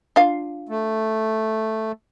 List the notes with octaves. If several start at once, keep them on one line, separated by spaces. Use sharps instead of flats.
D4 F4 F5
A3